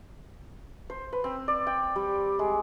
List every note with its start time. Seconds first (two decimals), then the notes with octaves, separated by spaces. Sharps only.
0.90 C5
1.13 B4
1.24 C4
1.48 D5
1.67 G5
1.96 G3
2.39 G#3